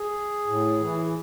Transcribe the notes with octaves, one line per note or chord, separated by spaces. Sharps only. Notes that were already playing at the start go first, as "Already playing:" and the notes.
Already playing: G#4
A2
E3